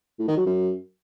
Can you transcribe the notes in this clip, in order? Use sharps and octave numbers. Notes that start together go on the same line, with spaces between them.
A2
D#3
F#3
F#2